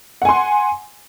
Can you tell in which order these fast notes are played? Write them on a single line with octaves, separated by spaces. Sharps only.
F#5 G#5 C6